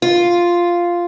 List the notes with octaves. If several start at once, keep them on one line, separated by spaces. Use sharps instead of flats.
F4